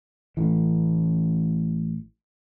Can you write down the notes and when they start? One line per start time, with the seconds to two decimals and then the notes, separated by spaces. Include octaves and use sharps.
0.37 A1 E3